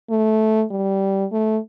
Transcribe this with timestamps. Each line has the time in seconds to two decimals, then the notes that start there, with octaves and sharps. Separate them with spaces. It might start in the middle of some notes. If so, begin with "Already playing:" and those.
0.10 A3
0.71 G3
1.32 A3